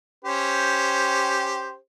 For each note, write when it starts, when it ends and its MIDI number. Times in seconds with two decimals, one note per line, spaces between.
0.25 1.76 61
0.25 1.76 67
0.25 1.76 72